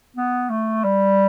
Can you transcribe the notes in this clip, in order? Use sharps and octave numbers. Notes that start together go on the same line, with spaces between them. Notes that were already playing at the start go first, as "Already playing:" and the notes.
B3
A3
G3